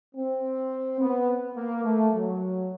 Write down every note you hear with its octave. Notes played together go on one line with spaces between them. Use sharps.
C4
B3
A#3
A3
F#3